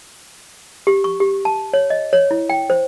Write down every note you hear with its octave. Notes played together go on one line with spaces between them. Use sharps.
G4
C#6
G4
A5
C#5
D#5
C#5
E4
G5
C5